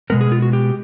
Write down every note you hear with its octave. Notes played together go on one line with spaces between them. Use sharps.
B2 G#3 B3 A#4
G#4
F4
F#4
G4